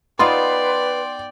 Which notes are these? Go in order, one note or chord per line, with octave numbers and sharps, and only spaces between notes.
B3 D#4 F4 B4 D5 G5 C6